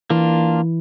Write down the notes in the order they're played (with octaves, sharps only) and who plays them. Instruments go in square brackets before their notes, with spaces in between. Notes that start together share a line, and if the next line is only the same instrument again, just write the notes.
[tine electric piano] E3 E4 [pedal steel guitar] A#3 D4 F4